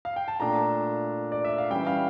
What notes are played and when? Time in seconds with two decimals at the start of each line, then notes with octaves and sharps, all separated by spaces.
0.05 F5
0.16 G5
0.28 A5
0.40 A#2 A3 D4 A#5
1.32 D5
1.45 E5
1.58 F5
1.70 E3 G3 C#4 E4 G5
1.87 F5